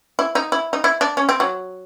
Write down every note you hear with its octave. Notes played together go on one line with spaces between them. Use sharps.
E4
D#4
E4
D#4
E4
D4
C#4
C4
F#3